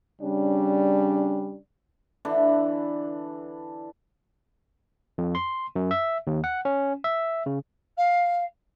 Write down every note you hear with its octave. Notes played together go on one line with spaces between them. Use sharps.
C#3 G3 C#4 D4
D3 E3 D4 B5
F2
C6
F#2
E5
D#2
F#5
C#4
E5
C#3
F5